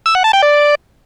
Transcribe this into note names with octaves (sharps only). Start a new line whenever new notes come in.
E6
F#5
A5
G5
D5